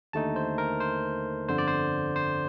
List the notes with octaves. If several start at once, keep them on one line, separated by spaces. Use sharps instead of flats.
D#2 D3 A3 D#4 A5
C5
A#4
C5
G1 F2 D3 C5
D5
C5
C5